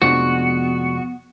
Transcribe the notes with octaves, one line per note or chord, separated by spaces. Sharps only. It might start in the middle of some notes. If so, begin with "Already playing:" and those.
F1 F3 G#3 B3 D4 F#4